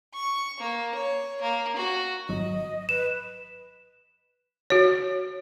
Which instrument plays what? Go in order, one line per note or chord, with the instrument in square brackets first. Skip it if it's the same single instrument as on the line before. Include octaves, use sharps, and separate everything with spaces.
[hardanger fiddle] C#6
A#3
C#5
A#3
F#4
[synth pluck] G#1 F#3 [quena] D#5
[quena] B4 [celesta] E7
[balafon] F#4 C#5